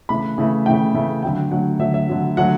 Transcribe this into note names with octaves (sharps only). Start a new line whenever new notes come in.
C#3 E3 A3 B5
C#3 E3 A3
C#3 E3 A3 G5
C#3 E3 A3
D3 F#3 A3 G5
D3 F#3 A3 F#5
D3 F#3 A3 E5
E5
D3 F#3 A3
D3 F#3 A3 F#5